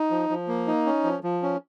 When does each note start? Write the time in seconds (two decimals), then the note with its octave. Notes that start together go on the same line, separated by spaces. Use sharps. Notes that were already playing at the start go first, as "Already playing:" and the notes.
Already playing: D#4
0.11 F3
0.30 F3
0.48 A#3
0.67 D#4
0.86 C#4
1.04 F3
1.23 F3
1.42 C#4